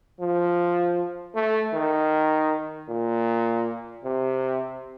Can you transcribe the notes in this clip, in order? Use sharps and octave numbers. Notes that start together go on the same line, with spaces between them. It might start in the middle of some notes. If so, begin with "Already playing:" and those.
F3
A3
D#3
A#2
C3